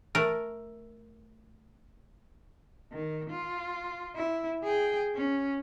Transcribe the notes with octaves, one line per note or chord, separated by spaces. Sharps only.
A3 A#4
D#3
F4
E4
G#4 G5
C#4